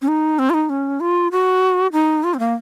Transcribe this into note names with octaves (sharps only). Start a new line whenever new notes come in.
C#4
D#4
C4
F4
D#4
C#4
F4
F#4
D#4
F4
C4
A#3